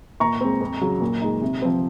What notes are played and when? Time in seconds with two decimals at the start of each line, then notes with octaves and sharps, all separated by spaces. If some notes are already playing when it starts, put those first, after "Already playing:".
0.20 A#2 A#5 C#6
0.41 G#3 C4
0.61 F2
0.81 C#3 F#3
1.01 A#2
1.22 G#3 D#4
1.42 C3
1.62 F3 C4